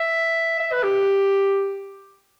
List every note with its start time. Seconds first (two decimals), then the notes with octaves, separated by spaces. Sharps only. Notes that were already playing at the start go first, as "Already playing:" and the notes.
Already playing: E5
0.60 E5
0.72 B4
0.83 G4